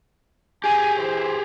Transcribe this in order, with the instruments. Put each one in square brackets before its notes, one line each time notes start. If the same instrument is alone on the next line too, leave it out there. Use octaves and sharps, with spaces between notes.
[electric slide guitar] G4 G#4 [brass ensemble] G#5
[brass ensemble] E3 C5